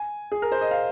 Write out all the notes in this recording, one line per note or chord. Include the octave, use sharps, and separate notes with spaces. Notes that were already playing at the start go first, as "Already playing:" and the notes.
Already playing: G#5
G#4
A#4
C5
D#5
F5